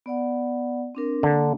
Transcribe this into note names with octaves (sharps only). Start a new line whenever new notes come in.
B3 D5 F#5
C4 D4 A#4
D3 A#3 D4